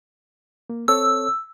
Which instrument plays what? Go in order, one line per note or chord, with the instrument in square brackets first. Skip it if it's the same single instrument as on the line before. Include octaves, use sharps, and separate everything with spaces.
[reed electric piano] A#3
[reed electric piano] C4 A4 C#5 [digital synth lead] E6